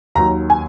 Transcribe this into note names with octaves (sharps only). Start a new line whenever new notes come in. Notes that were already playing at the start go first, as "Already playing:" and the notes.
D#2 D#3 F#3 A#5
G#5